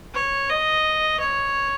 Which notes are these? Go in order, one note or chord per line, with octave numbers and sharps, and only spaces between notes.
C#5
D#5
C#5